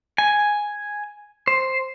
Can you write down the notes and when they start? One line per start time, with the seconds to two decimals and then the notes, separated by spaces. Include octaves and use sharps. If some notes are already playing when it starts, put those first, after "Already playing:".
0.18 G#5
1.48 C5